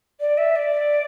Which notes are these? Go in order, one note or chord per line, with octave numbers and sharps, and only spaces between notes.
D5
E5
D5